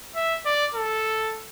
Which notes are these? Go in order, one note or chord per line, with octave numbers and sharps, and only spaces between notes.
E5
D5
A4